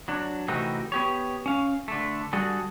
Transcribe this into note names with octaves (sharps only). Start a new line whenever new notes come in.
F#3 D4
C3 E3 A3 C4 D#4 F#4
B3 G4 C#5
C#4 F5
D3 A3
D3 G3 F#4 G#4 A4